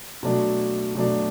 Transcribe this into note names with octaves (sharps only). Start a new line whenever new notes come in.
B2 F#3 A3 D4
B2 F#3 A3 D4